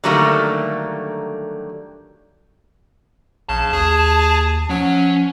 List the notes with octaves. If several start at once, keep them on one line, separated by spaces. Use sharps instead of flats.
D3 D#3 F#3 G3 A3 A#3
A#1 C#3 A5
D#2 G#4
F3 F#3 C#4